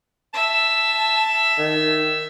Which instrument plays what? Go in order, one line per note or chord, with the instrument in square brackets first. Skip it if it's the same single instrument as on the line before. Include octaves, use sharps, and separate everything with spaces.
[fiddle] E5 [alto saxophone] A5
[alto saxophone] D#3